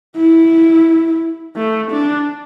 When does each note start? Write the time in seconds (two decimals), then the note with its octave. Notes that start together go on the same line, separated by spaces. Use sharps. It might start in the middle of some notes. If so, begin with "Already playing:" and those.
0.16 E4
1.56 A3
1.91 D4